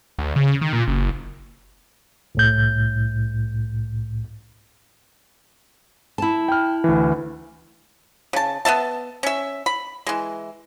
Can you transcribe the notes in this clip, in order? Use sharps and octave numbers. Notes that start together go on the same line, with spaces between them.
D2
C#3
D#3
A#2
F#1
C2 A2 G6
E4 A5
G5 F6
D2 E3
C#3 A5
B3 E4 E5 A5
C#4 E5
B5
E3 G#3